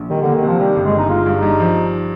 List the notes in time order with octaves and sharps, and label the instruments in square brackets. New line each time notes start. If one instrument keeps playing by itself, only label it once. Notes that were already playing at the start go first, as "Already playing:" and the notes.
Already playing: [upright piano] A#1
[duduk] D#3 [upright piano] G3
[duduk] D3
[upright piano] A#3
[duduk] D#3
[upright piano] C3 [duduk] F3
[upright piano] D#3 [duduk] G3
[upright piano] G1
[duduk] G#3
[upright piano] G1
[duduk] D#4
[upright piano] G#3 [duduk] F4
[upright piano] G2
[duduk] D#4
[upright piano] G2
F3